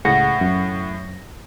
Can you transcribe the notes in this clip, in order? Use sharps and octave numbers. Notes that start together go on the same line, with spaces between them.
C#2 A2 G#4 F#5 A#6
F#2